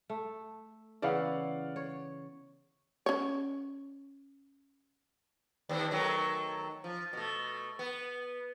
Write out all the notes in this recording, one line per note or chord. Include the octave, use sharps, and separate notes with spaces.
A3
C#3 E3 B3 D5 F5 F#5
C#5
C#4 C#5
D#2 C4
D#3 F#3 A3
F3
B2 A3
B3